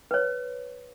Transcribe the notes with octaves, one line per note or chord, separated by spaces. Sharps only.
B4 C#5